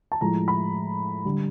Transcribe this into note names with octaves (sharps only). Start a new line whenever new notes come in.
A5
A2 F3 G#3 A#5
B5
D3 G3